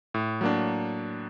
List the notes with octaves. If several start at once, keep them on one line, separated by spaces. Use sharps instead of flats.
A2
F#3 A#3 D4